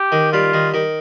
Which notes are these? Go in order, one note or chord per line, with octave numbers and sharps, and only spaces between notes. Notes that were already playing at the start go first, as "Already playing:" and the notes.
Already playing: G4
D#3
G3 F4
D#3
D#3